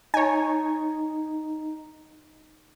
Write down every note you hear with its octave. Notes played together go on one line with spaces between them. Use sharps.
D#4 C#5 G#5